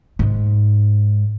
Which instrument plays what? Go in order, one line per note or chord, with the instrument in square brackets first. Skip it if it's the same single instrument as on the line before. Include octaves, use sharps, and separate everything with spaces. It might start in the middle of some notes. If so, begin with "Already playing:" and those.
[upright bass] G#2